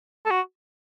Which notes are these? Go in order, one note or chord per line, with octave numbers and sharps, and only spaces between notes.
A4
F#4